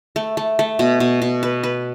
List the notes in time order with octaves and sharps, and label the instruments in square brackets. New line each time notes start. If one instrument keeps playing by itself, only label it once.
[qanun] A3
A3
A3
B2
B2
B2
B4
B4